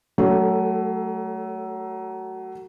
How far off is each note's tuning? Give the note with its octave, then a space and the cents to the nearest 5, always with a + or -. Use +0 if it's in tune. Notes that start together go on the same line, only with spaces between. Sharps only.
F#3 +25 A3 +0 A4 +35